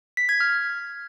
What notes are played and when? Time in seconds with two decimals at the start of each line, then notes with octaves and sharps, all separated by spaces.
0.17 B6
0.29 G#6
0.40 F6